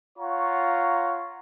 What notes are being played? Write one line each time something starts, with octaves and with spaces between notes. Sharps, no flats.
F4 C#5 F#5 A#5 C#6